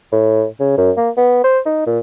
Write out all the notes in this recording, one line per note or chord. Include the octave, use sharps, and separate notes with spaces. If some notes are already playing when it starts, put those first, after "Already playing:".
A2
C#3
F#2
A#3
B3
C5
D#4
A#2